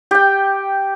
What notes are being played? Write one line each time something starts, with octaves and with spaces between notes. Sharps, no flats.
G4 G5